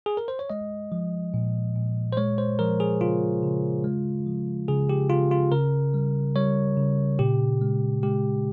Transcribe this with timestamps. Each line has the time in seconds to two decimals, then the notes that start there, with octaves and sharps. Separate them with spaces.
0.06 G#4
0.17 A#4
0.28 C5
0.39 C#5
0.50 G#3 D#5
0.92 F3
1.34 A#2
1.75 A#2
2.13 C5
2.17 G#3 C#5
2.38 C5
2.59 F3 A#4
2.80 G#4
3.01 C#3 F4
3.43 C#3
3.84 G#3
4.26 F3
4.68 C#3 G#4
4.89 G4
5.10 C#3 F4
5.31 F4
5.52 C#3 A#4
5.94 G3
6.36 G3 C#5
6.77 C#3
7.19 A#2 G4
7.61 G#3
8.03 G#3 G4